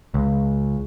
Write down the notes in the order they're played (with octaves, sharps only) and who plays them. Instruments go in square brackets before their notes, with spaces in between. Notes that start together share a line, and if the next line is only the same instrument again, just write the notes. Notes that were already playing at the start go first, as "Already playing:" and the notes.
[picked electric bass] C#2